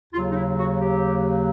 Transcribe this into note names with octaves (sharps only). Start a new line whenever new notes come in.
D#2 C#3 F#3 F4
D#4
E4
F#4
G4